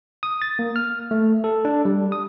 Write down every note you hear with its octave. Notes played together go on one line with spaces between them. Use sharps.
D#6
A6
A#3
F6
A3
A4
D4
G3
D#6